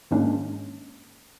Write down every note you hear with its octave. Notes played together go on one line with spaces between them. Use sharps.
G#2 D#3 G#3 A#3 C#4 D4